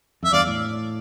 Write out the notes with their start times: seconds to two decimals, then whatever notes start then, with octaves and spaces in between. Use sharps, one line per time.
0.23 F2 E5
0.32 E2 G2 D5 F5
0.47 A2